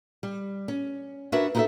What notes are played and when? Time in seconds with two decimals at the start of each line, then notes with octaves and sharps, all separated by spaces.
0.23 G3
0.68 C#4
1.32 D4 F#4 A#4 B4 C#5 E5
1.55 D#4 E4 F#4 G#4 A4 E5